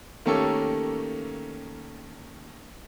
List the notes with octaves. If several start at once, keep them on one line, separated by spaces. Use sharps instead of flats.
D#3 A3 A#3 C#4 G4 A4